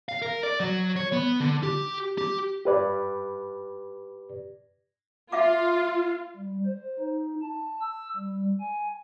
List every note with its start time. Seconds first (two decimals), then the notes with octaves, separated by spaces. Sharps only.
0.09 F5
0.22 A#4
0.43 D5
0.60 F#3
0.96 C#5
1.13 B3
1.40 D3
1.63 G4
2.18 G4
2.65 G4 B4 D5
5.32 F4 E5 F5 D6
6.36 G3
6.66 C5
6.99 D#4
7.42 A5
7.81 E6
8.16 G3
8.60 G#5